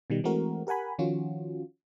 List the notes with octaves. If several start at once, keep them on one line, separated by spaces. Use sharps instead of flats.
B2 D#3 G3
E3 G#3 A3 C4 F#4 A#4
G4 A#4 F#5 G#5 B5
D#3 F3 C#4 F4 F#4